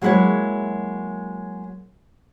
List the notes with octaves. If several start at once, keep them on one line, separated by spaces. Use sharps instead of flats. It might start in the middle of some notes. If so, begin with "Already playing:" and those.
F#3 G#3 A#3 E4 F#4 C#5